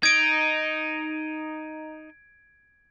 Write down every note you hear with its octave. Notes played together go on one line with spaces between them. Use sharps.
D#4 G#6 D7